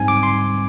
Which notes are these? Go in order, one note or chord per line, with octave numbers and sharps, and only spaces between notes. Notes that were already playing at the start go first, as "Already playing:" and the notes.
Already playing: G#2 G3 C4 D#4 G#5
D6
C6